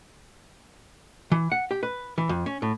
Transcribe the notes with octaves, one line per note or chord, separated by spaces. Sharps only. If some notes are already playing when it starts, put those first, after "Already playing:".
E3
F#5
G4
B4
E3
F2
C#4
A2